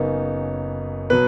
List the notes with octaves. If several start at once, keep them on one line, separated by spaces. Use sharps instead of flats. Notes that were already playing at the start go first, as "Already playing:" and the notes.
Already playing: F#1 F#2 C#3 B3 D#4
B2 F#3 B4